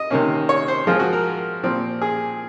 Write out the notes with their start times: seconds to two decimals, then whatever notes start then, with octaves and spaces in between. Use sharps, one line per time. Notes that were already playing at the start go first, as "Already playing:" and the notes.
Already playing: D#5
0.10 C3 D#3 A#3 C#4
0.49 C#5
0.68 C5
0.87 F3 G#3 C4 F4
1.00 F#4
1.13 A#4
1.63 A#2 F3 C4
2.02 G#4